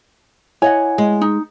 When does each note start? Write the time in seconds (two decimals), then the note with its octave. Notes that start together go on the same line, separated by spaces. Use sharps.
0.62 E4 C#5 D#5 F#5 G#5
0.98 G#3
1.21 D#4